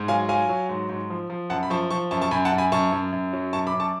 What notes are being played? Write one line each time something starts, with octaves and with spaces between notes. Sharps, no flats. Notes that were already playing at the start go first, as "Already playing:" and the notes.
Already playing: G#2
F#3 F5 G#5
F#3 F5 G#5
F#3
G#2
G#2
F3
F3
F#2 F#5 A5
B5
F3 A5 C#6
F3 A5 C#6
F#2 A5 C#6
A5 C#6
F#2 G#5 B5
F#5 A5
F#2
G#5 B5
F#2 A5 C#6
F#2
F#2
F#3
F#2 A5 C#6
B5 D6
F#2
A5 C#6